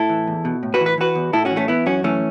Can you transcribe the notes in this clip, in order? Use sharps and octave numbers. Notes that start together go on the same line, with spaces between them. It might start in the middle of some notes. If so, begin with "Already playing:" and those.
Already playing: A2 E4 A4
E3
E2
B2
A2
F#4 B4
E3
B4
E3 F#4 B4
E2
A2 E4 A4
C#4 F#4
E3
A3 C#4
E3 B3 E4
F#2 C#4 F#4
E3 A3 C#4